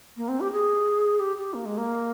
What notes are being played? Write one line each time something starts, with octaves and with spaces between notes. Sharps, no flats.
A#3
C4
G4
G#4
G4
G4
A#3
G#3
A#3